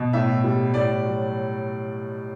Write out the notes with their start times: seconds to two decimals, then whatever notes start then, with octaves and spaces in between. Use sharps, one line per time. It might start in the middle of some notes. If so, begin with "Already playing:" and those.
Already playing: B2
0.13 A2 E5
0.44 G3
0.74 A2 D5
1.04 F#3